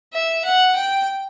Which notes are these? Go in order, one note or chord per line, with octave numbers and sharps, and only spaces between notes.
E5
F#5
G5